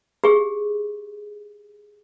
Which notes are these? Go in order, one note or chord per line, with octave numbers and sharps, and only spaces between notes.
G4 G#4